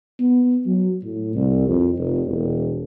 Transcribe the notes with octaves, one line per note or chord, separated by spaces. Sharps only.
B3
F#3
A2
C2
F2
F1
E1